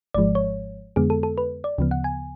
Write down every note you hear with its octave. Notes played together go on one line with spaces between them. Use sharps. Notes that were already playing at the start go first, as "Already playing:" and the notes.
G#1 G#2 F3 G#3 D5
C#5
F2 D3 G#3 B3 G#4
A4
A4
B4
D5
D2 C#3 F3 B3
F#5
G#5